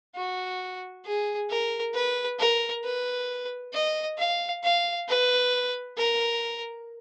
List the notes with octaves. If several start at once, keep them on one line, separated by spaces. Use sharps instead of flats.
F#4
G#4
A#4
B4
A#4
B4
D#5
F5
F5
B4
A#4